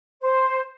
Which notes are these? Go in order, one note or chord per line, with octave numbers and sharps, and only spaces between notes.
C5